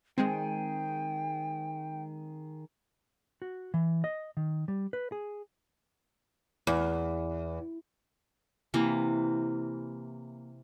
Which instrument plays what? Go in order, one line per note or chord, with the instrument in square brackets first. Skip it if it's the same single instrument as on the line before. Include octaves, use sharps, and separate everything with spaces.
[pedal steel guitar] D#3 G#4 [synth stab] G#3 C4 [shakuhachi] G5
[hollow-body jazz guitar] F#4
E3
D#5
D#3
G3
B4
G#4
[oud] E2
[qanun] C3 E3 A#3